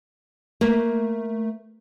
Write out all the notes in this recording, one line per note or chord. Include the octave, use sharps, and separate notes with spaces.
A3 A#3